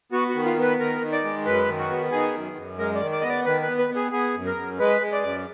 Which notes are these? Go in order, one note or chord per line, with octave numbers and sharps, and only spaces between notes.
B3 F#4
F#4
D#3
F4
B3 B4
D#3 A#4
D#3
D5
G#3
F#2 B4
D#3
F#4
B3
D#3 G#4
F#2
F#2
G#3 A#4
D5
D#3
D5
B3 D#5
D5
D#3 B4
B4
B3
B4
B3
G#4
B3 G#4
F#2
A#4
F#2
G#3 B4
G#3
D5
F#2